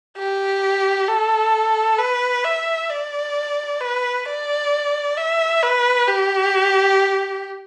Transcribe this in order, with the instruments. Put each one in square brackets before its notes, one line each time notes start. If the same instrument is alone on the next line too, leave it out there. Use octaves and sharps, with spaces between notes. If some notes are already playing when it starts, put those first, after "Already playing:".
[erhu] G4
A4
B4
E5
D5
B4
D5
E5
B4
G4